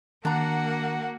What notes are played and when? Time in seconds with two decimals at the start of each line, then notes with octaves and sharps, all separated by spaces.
0.25 D#3 A#3 D4 F#4 F#5 A#5